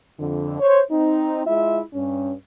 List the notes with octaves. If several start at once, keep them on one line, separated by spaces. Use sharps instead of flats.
F2 D3
C5 C#5
C4 D#4
G#3 E4 F4 E5
G2 C#4